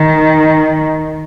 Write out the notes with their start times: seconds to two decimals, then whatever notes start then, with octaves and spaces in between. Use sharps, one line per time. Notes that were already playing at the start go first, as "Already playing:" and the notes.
Already playing: D#3